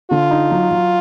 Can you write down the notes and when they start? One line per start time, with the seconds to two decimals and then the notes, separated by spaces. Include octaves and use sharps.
0.11 D3 F4
0.31 D#4
0.51 F#3
0.71 F#3